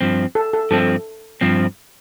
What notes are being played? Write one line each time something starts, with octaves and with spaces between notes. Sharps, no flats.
G2 F3 C4
A4
A4
G2 F3 C4 A4
G2 F3 C4